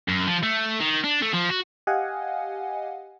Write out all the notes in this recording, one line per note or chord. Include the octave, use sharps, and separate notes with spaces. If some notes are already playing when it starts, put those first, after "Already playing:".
F#2
F3
A3
D#3
D4
A3
F3
F#4
G4 D#5 F5 F#5 G#5